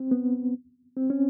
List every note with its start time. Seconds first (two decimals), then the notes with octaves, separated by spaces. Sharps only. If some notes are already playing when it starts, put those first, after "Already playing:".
Already playing: C4
0.11 B3
0.97 C4
1.10 C#4